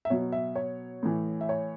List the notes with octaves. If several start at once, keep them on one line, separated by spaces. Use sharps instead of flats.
E5
B2 F#3 C#5
E5
C#5
A2 E3
E5
C#5